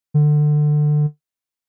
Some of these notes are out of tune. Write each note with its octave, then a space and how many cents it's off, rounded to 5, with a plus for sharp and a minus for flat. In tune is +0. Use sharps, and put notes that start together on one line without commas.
D3 +25